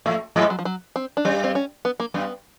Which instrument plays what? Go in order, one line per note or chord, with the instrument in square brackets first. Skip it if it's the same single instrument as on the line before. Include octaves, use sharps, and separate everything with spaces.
[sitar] A2 A3 [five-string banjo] F3
[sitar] G#2 G#3 [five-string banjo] F#3
[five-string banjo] F#3
F3
F#3
C4
D4
[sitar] G2 G3 [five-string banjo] C#4
[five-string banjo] C4
C#4
B3
A#3
[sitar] G2 G3 [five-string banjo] B3